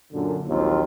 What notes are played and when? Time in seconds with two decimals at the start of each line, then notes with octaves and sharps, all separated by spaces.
0.13 F#2 A#2 D3
0.48 A#1 D#2 F#3 C4 F4